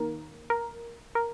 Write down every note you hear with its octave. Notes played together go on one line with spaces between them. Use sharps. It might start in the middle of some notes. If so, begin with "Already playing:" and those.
Already playing: D#3 A#3 A#4
A#4
A#4